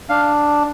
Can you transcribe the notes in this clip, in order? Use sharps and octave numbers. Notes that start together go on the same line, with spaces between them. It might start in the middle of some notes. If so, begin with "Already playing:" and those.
D4 F5